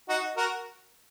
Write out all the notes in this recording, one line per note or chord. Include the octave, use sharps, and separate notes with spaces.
D#4 F#4
F#4 A#4